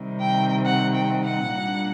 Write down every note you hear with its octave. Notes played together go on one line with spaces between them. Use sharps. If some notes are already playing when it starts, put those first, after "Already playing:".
Already playing: C3 D#3 G3 C4
G5
F#5
G5
F#5
A#2 G3 A#3 D4